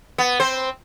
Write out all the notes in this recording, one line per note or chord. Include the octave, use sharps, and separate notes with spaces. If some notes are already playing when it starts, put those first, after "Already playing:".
B3
C4 C5